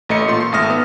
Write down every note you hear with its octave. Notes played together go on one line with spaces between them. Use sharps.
A1 A3 D#5 C#7
A#2 A3 C6
C6 C#6
G#1 A3 E5 D#6 F6 A#6
B3